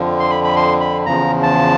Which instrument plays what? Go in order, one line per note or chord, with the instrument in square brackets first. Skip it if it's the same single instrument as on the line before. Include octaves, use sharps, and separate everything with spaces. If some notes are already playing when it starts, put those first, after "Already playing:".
Already playing: [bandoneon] F2 D3 F3
C6
B5
B5
C6
B5
E2 C#3 F3 A#5
A5